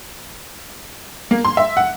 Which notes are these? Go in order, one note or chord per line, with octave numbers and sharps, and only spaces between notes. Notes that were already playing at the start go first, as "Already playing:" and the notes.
A#3
C6
E5
F#5